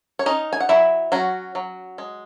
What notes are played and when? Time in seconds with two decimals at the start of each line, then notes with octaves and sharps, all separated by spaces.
0.19 C#5
0.26 C#4 D#4 D#5
0.53 G#5
0.60 F#5
0.69 F#3 E4 E5
1.12 F#3 C#4 F#4
1.55 F#3
1.98 G#3